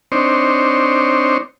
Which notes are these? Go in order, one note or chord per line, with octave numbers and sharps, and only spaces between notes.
C4 D4 D#4 C5 C#5